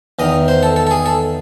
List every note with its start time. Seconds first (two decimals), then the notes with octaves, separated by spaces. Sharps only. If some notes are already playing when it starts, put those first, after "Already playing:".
0.19 E2 D#3 D#5
0.48 C5
0.63 A4
0.76 A4
0.87 A4
0.91 G#4
1.06 A4